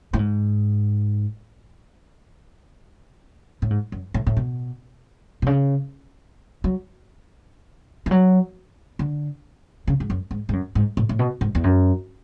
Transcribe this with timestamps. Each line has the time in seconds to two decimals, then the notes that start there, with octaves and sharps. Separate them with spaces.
0.13 A2
0.19 G#2
3.62 A2
3.70 G#2
3.92 F#2
4.14 A2
4.27 A2
4.37 B2
5.42 B2
5.46 C#3
6.64 F#3
8.06 E3
8.11 F#3
8.99 D3
9.87 C#3
10.00 G#2
10.10 F#2
10.31 G#2
10.49 G#2
10.53 F#2
10.75 G#2
10.97 A2
11.09 A2
11.19 B2
11.41 G#2
11.55 E2
11.64 F#2